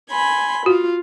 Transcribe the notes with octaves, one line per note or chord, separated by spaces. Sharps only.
G#5 B5 C6
F4 F#4